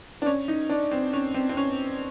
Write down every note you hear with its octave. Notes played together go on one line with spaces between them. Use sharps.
D4
C#4
D#4
D4
C4
C#4
C4
C4
C#4